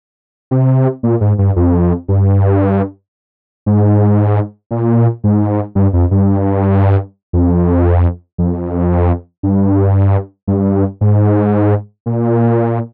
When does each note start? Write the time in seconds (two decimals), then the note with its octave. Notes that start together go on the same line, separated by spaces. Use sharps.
0.51 C3
1.03 A#2
1.21 G#2
1.38 G2
1.56 F2
2.08 G2
3.66 G#2
4.71 A#2
5.24 G#2
5.75 G2
5.93 F2
6.11 G2
7.33 F2
8.38 F2
9.43 G2
10.47 G2
11.01 G#2
12.06 A#2